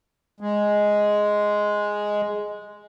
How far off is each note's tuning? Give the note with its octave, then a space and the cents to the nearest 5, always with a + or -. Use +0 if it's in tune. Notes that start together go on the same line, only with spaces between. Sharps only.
G#3 +0